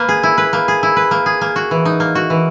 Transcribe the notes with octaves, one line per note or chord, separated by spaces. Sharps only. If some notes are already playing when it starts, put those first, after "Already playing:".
Already playing: A#3 B4
G#4
E4
B4
A#3
G#4
E4
B4
A#3
G#4
A#3
F#4
E3
D#4
A#3
F#4
E3